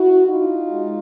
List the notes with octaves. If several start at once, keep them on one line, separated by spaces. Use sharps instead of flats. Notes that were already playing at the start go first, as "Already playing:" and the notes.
Already playing: E4 F#4
D#4 F4
G#3